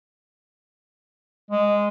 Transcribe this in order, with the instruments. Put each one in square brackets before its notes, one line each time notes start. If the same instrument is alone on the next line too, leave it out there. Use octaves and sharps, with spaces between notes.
[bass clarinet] G#3